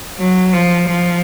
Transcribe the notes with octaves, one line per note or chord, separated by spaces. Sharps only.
F#3
F3
F3